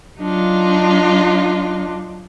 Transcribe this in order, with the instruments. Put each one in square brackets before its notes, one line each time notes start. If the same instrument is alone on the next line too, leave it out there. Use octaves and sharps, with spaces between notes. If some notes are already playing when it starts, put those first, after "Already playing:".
[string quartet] F#3 D4 D#4 F4